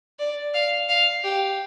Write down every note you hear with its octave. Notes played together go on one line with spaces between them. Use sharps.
D5
F5
F5
G4